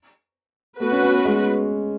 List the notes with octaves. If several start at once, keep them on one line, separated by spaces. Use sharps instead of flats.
A3 B3 F#4 B4
C#4
C#4
G#3